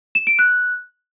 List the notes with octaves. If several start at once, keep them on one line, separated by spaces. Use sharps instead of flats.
E7
D7
F#6